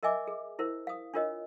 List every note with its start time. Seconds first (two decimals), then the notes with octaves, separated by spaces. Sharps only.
0.03 A#4 D#5 E5 G#5 D6
0.27 G#4
0.59 E4 A#4 C5
0.87 F5 D#6
1.14 D4 F4 A#4 C#5 D#5